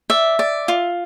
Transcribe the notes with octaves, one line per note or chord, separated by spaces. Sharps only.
D5 E5
D5
F4